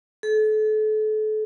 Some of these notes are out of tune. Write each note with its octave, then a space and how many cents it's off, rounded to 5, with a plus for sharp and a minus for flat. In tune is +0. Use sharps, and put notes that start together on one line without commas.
A4 -35